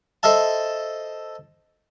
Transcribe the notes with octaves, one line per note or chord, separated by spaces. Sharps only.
A4 C5 D#5 E5 A5